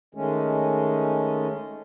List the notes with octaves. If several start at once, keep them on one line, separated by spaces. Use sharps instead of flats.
D#3 G#3 A3 C#4